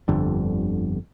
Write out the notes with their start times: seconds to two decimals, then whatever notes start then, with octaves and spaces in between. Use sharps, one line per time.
0.08 G1 F2 D3 G3